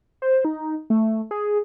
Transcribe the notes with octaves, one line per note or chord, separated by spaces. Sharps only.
C5
D#4
A3
G#4